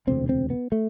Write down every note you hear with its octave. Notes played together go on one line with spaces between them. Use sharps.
E1 D2 C3 C4
C4
B3
A3